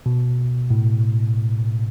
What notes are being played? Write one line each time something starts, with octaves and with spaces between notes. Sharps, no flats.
B2
A2